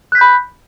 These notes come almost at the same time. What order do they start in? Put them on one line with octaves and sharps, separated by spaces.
F#6 B6 G6 B5